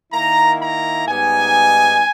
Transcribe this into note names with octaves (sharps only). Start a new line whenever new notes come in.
D#3 A#3 E4 A#5
A#5
G#2 G3 B3 D#4 G#5